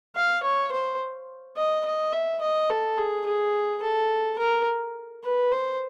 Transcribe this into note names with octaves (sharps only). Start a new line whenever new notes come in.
F5
C#5
C5
D#5
D#5
E5
D#5
A4
G#4
G#4
A4
A#4
B4
C5